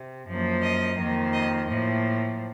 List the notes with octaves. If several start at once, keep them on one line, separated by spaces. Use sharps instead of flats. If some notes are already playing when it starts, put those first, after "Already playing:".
Already playing: C3
F#2 F3 A#3
D#5
F2 D#3 A#3
D#5
A2 F3 A#3